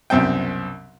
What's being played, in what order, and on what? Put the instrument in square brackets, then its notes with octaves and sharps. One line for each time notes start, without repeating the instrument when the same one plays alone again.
[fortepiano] C2 F#2 B2 C4 G5